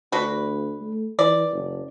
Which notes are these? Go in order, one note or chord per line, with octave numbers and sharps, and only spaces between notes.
D2 D4 F#4 B4
A3
E3 D5
F#1